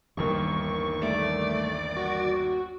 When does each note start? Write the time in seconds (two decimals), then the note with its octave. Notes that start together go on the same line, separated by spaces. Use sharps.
0.17 G1 D#2 D#3 E3 G3 A#4 C#6
1.03 A3 D5
1.96 F#4